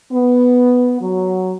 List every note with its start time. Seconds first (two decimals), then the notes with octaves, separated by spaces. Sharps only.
0.11 B3
1.01 F#3